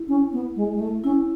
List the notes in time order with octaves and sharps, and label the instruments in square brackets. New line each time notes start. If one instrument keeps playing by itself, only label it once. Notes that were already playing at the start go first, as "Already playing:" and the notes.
Already playing: [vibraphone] E4
[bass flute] C#4
B3
G#3
G#3
A3
[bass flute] C#4 [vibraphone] E4